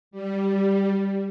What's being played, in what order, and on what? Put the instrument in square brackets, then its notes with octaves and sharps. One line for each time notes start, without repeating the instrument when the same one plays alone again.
[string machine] G3